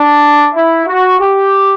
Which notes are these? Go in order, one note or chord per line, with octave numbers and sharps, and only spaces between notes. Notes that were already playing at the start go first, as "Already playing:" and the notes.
Already playing: D4
E4
F#4
G4